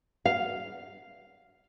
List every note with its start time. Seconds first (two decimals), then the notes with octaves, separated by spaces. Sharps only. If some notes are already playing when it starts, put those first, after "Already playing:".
0.25 F5